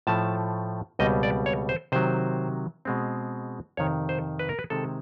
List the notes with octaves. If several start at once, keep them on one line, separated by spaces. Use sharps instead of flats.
A2 F3 A3 A5
C#2 B2 G3 C4 D#5
D5
C#5
C5
C3 D#3 F#3 C5
B2 G#3 C4
F2 C3 D#3 C#5
C5
B4
A#4
B4
C3 D#3 G#3 C4 A4